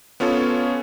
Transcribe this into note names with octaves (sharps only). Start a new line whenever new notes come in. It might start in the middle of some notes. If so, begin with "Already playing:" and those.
B3 C#4 F4 A4 C#5